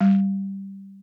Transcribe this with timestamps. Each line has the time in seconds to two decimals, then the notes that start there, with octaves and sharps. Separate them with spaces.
0.01 G3